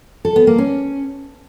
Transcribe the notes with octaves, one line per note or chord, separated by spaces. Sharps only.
A4
B3
A#3
C#4